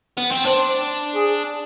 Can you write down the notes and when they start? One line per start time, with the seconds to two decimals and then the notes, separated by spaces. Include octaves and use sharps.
0.18 B3
0.32 C4
0.45 D4 C5
1.15 G#4